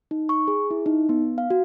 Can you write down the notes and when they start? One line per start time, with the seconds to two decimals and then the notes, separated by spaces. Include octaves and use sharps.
0.11 D#4
0.29 C#6
0.48 G#4
0.71 E4
0.86 D#4
1.09 B3
1.38 F5
1.50 F#4